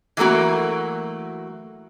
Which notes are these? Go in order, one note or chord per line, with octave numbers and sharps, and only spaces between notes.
E3 F#3 A3 A#3 F#4